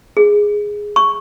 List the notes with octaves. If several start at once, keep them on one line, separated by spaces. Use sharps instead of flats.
G#4
C#6